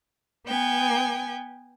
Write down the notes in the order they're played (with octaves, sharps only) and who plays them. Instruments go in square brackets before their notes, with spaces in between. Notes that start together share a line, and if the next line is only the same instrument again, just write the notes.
[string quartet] B3 G5 G#5